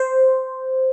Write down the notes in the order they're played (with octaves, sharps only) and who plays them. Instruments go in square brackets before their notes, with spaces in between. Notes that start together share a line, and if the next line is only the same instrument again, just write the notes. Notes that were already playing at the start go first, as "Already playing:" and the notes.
Already playing: [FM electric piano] C5